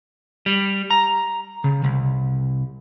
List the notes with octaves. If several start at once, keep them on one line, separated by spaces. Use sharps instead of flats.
G3
A#5
C#3
C2